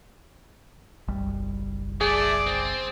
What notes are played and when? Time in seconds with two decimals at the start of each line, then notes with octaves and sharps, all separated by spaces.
1.08 F#1 B1 G3
2.01 A3 G#4 D5
2.47 C4